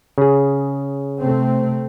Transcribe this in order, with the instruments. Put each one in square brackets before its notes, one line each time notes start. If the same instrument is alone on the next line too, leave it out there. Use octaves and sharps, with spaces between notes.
[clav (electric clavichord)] C#3 G#4
[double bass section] C3 A3 C4